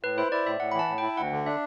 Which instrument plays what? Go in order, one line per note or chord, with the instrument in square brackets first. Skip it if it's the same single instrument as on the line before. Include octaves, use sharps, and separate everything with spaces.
[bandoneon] A2 [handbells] B4
[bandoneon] E4 [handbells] C5
[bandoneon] E4 [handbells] D5
[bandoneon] A2 [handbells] E5
[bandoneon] A2 [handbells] F#5
[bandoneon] E3 [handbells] B5
[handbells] A5
[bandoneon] A2
[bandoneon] E4 [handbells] G5
[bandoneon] D2 [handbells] F#5
[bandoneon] D3
[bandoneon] D4 [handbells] E5